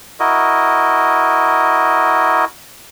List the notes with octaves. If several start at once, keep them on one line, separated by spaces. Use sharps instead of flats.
E4 F#4 A#4 D#5